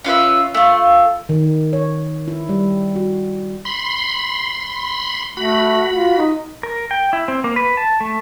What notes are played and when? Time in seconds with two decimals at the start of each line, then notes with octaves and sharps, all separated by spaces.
0.04 C#4 F4 B4 E5
0.54 A3 F4
1.29 D#3
1.73 C#5
2.28 E4
2.49 G3
2.96 F#4
3.65 B5 C6
5.37 A3 F#4 B5
5.93 F4
6.18 D#4
6.63 A#4
6.91 G5
7.13 E4
7.28 C4
7.44 A#3
7.56 B4
7.77 A5
8.01 A3